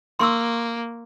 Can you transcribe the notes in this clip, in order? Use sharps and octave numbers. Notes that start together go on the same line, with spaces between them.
A#3 C6 C#6 E6